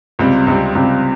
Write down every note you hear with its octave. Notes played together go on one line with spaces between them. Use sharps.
C#2 C3 G3 C4
C#2 C3 G3 C4
C#2 C3 G3 C4